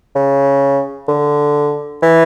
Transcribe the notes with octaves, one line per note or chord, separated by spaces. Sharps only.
C#3
D3
E3